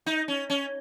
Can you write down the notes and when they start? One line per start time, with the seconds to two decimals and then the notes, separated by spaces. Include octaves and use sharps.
0.06 D#4
0.28 C#4
0.50 C#4